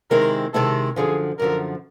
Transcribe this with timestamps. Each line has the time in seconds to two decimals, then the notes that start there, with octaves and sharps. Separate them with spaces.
0.11 C3 D#3 G#3 C4 E4 A#4
0.54 C3 D#3 G#3 C4 E4 A4
0.96 F#2 D3 F3 G#4
1.39 F#2 D3 F3 A#4